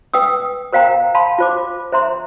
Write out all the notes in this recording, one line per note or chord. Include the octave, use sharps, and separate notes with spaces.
B4 G5 D#6 E6
A#4 C5 F5 G5 A#5
F5 A5 B5 C6
F4 C5 D6
C5 E5 A#5 C6